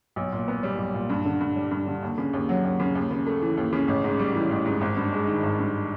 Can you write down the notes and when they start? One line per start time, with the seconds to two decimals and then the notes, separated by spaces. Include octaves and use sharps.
0.16 B1
0.32 A#2
0.48 B3
0.63 G3
0.78 B1
0.94 A#2
1.10 G2
1.25 D3
1.41 G2
1.56 G3
1.71 G2
1.87 D3
2.02 D#2
2.18 C#3
2.33 D#2
2.49 F#3
2.64 D#2
2.80 C#3
2.95 D#2
3.11 C#3
3.27 A3
3.42 E3
3.57 D#2
3.73 C#3
3.88 A1
4.04 G#2
4.19 G3
4.35 E3
4.51 A1
4.66 G#2
4.81 G#1
4.97 G2
5.12 G#3
5.27 D#3
5.43 G#1
5.59 G2